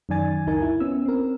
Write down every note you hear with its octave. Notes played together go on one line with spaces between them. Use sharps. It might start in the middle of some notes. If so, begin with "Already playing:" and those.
F#2 D#3 D5 G#5 A6
C#2 D#4 A#4 G#5
E4
B3 C#4 E6
C4 A#4